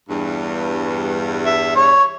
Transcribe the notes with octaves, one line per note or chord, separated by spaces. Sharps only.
E2 G2
E5
C#5